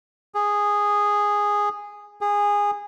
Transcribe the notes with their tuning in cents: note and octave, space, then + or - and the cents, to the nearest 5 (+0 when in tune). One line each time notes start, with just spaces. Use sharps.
G#4 -10
G#4 -20